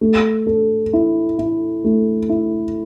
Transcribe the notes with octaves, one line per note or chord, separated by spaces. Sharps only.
A3
A4
E4
E4
A3
E4